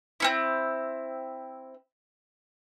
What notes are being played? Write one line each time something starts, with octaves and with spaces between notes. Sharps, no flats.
C4 C#4 E4